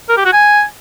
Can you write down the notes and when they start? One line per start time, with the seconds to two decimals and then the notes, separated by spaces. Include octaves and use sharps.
0.09 A#4
0.17 G4
0.25 F#4
0.33 G#5